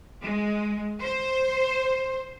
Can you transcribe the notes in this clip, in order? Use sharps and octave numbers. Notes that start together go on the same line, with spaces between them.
G#3
C5